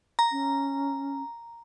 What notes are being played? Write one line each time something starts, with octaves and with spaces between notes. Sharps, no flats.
A#5
C#4